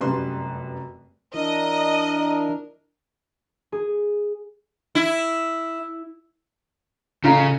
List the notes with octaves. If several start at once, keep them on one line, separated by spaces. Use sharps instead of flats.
F1 F#2 G3 B4 C6
E3 D4 E4 A#4 D#5
G#4
E4
A1 C#3 F4 A#5